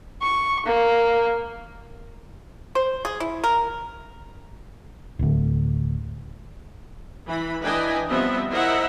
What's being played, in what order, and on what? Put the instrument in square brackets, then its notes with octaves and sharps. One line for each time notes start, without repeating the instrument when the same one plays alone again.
[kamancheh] C#6
A#3
[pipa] C5
G#4
E4
A#4
[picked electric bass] D1 D2
[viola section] E3 B5
E3 D4 B4 D#5 G5 G#5
F3 G3 B3 C4 D#5 E5
E4 A#4 C5 D#5 E5 F#5